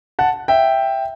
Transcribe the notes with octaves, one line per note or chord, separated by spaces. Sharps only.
F#5 A5
E5 G5